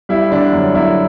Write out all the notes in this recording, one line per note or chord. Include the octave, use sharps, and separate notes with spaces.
G3 E4
D3 D4
F#2
F#2 E4